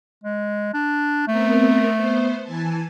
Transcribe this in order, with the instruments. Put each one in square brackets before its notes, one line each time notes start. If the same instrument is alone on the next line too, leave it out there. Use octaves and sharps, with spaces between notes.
[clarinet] G#3
D4
[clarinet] A3 [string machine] B3 C4 A#4
[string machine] B3 C5
E3 G#5 A5